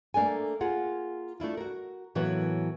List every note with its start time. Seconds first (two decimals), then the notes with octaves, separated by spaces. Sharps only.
0.14 A3 A#3 D4 A4 G#5
0.61 A#3 F4 G#4 F#5
1.40 A3 D4 E4 F4
1.57 F#4 A#4
2.15 A2 E3 F#3 A#3 B3